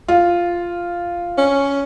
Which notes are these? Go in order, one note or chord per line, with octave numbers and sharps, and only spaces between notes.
F4
C#4